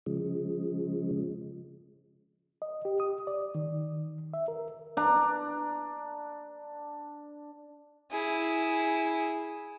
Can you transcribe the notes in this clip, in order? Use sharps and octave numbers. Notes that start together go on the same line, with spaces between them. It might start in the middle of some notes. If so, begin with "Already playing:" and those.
C#3 F3 G#3
D#5
G4
D#6
D5
D#3
E5
A#4
D4 A#5
E4 G#4